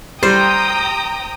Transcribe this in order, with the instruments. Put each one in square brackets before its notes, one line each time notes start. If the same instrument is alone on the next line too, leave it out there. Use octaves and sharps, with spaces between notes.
[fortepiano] G3 [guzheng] C5 [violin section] G5 A#5 D#6